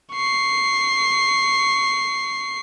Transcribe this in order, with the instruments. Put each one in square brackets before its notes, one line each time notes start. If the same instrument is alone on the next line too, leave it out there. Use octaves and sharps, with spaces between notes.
[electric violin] C#6 C7